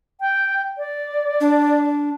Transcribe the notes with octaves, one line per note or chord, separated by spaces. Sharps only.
G5
D5
D4